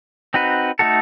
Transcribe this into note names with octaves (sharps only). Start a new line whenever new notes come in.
C4 D#4 F#4 B4
A3 D#4 F#4 A4